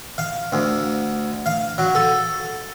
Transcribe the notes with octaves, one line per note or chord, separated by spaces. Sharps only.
F5
D2
F5
F#3
A4